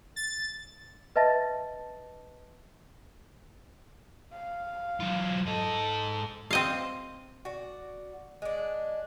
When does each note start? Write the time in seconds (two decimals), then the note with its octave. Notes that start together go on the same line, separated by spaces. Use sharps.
0.16 A6
1.16 B4 D#5 E5 A5 A6 A#6
4.33 F5
5.00 F#3 F4
5.46 G#2 A4 D#5
6.51 C4 D#5 F5
7.45 F#4 D5
8.42 G#3 D4